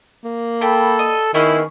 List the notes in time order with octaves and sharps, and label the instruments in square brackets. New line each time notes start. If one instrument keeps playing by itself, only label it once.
[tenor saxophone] A#3
[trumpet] A4 [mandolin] G5 B5
[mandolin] D#5
[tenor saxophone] D#3 [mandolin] B3 C#4 G#4 [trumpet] E4